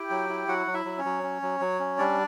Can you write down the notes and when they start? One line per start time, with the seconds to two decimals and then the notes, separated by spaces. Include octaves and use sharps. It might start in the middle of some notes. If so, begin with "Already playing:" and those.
Already playing: E4 G4 G5
0.10 F#3
0.29 E4
0.48 F#3 F#4 F#5
0.67 F#3
0.74 E4 E5
0.85 F#3
0.98 C#4 C#5
1.05 F#3
1.23 C#4
1.42 F#3
1.60 F#3
1.80 C#4
1.98 G3 D4 D5